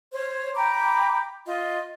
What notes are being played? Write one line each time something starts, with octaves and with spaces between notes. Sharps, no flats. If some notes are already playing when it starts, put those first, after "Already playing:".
C5 C#5
G5 A#5 B5 D6
F4 D#5